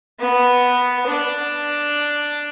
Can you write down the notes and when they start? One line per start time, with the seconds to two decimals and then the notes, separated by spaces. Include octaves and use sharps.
0.20 B3
1.07 D4